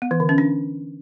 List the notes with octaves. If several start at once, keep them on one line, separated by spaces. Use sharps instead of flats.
B3
E3
D3
C#4
D4